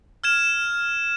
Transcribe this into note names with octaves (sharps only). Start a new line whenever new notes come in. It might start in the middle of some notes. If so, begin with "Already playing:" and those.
F6 G#6 E7